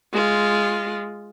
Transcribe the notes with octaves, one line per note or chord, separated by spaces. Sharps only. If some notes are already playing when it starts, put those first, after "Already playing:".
G#3 F4